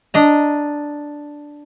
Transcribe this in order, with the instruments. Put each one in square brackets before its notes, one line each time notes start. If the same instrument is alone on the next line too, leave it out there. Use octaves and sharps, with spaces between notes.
[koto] D4 D#5 A#5